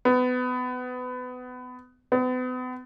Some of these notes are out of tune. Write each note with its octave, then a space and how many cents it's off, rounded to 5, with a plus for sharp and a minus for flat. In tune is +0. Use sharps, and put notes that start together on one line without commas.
B3 +25
B3 +40